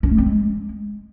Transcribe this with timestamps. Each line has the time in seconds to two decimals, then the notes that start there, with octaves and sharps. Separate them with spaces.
0.03 C#4
0.11 A3
0.18 C4
0.26 G#3